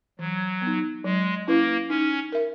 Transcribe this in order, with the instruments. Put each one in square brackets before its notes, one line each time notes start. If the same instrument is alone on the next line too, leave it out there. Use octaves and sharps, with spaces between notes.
[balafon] E3 [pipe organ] F#3
[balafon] B3
D#4
[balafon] F#3 [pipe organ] G#3
[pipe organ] A#3 [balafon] C#4 E4 B4
[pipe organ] C#4 [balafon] D#4
[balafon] A#4 E5